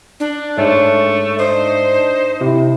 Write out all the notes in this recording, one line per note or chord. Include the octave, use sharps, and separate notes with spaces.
D4
G#2 G#3 A3 C#5
D4 D#4 C5
C3 E4